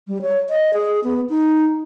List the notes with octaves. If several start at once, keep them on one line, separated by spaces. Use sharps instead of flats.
G3
C#5
D#5
G#4
B3
D#4